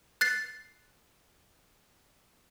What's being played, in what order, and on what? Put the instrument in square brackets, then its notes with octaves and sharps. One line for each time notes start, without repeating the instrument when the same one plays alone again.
[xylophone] F#6 A6 C7